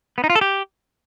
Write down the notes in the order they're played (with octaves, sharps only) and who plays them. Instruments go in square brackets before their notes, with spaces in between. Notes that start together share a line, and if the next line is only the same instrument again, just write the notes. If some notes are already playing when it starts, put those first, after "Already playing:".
[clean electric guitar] B3
D#4
F4
A4
G4